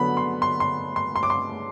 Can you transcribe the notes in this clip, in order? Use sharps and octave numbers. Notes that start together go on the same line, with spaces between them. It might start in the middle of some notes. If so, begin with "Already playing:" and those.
Already playing: D3 F#3 B3 B5
C6
C6
C6
C6
C6
D6
C6